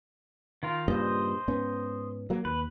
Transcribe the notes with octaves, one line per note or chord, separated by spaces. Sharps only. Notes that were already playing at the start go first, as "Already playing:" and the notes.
D#3 F4 A#4
G2 A#2 C#3 C5 D#5
G#2 B3 C#4
F#3 A#3
D#2 B4